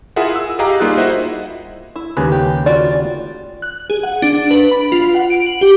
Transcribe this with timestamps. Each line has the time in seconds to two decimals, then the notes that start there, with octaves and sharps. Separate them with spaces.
0.16 E4 F4 G#4 A#4 E5 F#5
0.36 E6
0.59 G4 G#4 D#5 F5 F#5 A#5
0.80 G3 A#3 D#4 F4 G#4 F#6
0.97 E4 F#4 C5 D#5 E5 F#5
1.96 E4
2.17 D#2 C#3 G#3 B4
2.32 G4
2.66 F4 F#4 D5
3.62 F#6
3.90 G#4
4.03 F#5
4.22 D4
4.51 B4
4.71 B5
4.92 F4
5.15 F#5
5.30 D7
5.46 F#7
5.61 G4